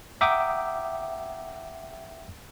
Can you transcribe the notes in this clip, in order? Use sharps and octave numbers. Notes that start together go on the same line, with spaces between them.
E5 F#5 G5 A#5 D6 D#6